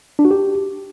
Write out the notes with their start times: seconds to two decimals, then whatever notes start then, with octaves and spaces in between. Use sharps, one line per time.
0.19 D4
0.25 F#4
0.31 G4